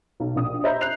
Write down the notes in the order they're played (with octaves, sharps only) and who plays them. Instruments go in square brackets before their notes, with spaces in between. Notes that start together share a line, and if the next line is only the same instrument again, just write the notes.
[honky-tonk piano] B1
A#1 D#6
C5 D#5 E5 A#5 B5 G6
F#6 C7 F7